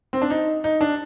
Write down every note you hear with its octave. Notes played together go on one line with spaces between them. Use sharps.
C4
D4
D#4
D#4
D4